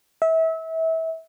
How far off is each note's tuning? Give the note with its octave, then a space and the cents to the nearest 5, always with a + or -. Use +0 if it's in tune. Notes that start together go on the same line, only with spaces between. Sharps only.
E5 -30